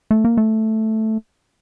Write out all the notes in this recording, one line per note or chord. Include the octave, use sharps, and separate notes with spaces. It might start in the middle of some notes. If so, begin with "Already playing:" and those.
A3
A#3
A3